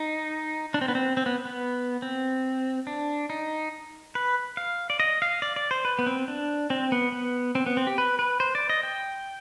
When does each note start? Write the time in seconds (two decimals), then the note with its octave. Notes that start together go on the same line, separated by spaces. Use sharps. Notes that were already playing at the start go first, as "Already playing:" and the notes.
Already playing: D#4
0.74 D4
0.81 C4
0.88 B3
0.95 C4
1.17 C4
1.26 B3
1.45 B3
2.02 C4
2.87 D4
3.30 D#4
4.15 B4
4.57 F5
4.90 D5
5.00 D#5
5.22 F5
5.42 D5
5.56 D5
5.71 C5
5.85 B4
5.99 B3
6.06 C4
6.28 D4
6.70 C4
6.92 B3
7.12 B3
7.55 C4
7.66 B3
7.77 C4
7.87 G4
7.98 B4
8.19 B4
8.40 C5
8.55 D5
8.70 D#5
8.83 G5